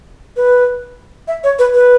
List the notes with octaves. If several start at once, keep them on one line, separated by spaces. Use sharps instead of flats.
B4
E5
C#5
B4
B4